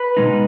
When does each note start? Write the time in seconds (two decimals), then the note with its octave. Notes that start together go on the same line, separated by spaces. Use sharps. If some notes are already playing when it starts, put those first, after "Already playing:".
Already playing: B4
0.17 B2 G#3 D#4